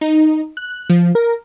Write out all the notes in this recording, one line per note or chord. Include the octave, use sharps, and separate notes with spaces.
D#4
F#6
F3
A#4